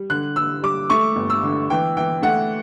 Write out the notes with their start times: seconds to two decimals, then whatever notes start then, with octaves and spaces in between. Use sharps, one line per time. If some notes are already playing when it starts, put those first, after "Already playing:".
Already playing: G3
0.10 D3 F#6
0.36 D3 E6
0.63 G3 D6
0.90 A3 C#6
1.16 G1
1.30 E6
1.43 D3
1.70 E3 G5
1.97 E3 G5
2.22 A3 F#5